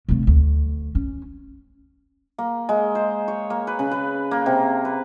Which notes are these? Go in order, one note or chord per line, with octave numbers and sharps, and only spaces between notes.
C2 A3
D2
C#4
A#3
G#3
C5
C#5
A#3
B4
C#3
B4
A#3
C3
B4